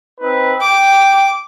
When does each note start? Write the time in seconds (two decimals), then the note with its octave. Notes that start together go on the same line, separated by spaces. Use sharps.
0.20 C4 D#4 B4
0.60 G5 D6